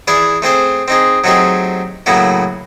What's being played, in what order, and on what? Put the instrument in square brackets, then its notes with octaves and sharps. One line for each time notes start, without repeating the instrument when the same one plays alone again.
[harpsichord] E3 E4 G#4 D5 G#5
A3 C4 G#4 C5
C4 D#4 G#4
F#3 A3 C4 D#4 G4 G#4
A2 C#3 F#3 A#3 B3 E4